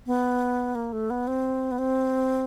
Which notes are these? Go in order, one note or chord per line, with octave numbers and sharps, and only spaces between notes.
B3
A#3
A3
B3
C4
B3
C4